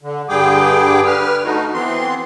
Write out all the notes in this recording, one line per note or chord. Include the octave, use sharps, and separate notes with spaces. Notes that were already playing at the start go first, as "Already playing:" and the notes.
D3
G2 D3 G3 G#4 G5 D6
B4 F6
A3 D#4 F#4
E3 B3 C4 C6